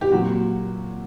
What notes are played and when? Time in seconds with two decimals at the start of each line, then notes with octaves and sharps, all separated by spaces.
0.01 G4
0.12 A#2 F#3 F#4